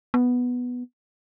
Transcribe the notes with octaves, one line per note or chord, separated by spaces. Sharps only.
B3